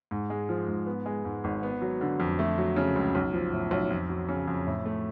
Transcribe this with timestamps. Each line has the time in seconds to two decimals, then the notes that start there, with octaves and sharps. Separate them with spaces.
0.11 G#2
0.30 G#3
0.49 F3
0.68 G#2
0.86 B3
1.06 G#3
1.25 G#2
1.44 G#1
1.63 B3
1.82 F#3
2.01 D3
2.20 F2
2.39 A3
2.58 F#3
2.76 C#3
2.96 C#2
3.15 B1
3.34 F3
3.53 A2
3.71 B1
3.91 F2
4.09 F#3
4.29 C#3
4.48 F2
4.67 A2
4.85 A3